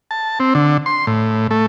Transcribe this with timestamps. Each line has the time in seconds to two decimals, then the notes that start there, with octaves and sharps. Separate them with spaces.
0.11 A5
0.40 C4
0.55 D3
0.86 C6
1.07 A2
1.51 A3